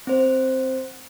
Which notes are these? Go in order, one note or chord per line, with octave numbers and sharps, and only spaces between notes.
C4 C5